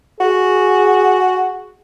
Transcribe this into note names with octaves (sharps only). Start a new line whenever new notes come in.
F#4 G#4